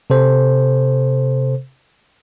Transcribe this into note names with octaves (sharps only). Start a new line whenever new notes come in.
C3 A4 C5